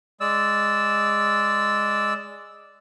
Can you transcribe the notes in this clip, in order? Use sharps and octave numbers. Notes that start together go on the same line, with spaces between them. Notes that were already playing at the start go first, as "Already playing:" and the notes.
G#3 D5 E6